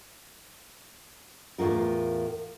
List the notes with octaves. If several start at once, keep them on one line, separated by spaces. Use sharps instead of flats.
E2 A2 C3 F4 A#4